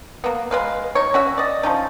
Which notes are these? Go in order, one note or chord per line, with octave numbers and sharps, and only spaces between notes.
A#3 B3
G#3 B4 F5
D#4 C#5
C#4 F#4 E5
D5 D#5
F3 C#4 D#4